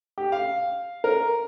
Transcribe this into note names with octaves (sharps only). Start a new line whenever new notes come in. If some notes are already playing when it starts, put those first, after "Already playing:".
G4
F5
A#4